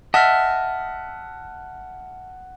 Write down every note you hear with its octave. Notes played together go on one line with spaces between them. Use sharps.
D#5 E5 F#5 A5 F6